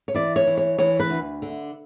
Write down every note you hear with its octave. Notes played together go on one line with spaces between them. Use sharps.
C#5
E3 D5
C#5
E3
C#5
E3 C#5
B4
D2
D3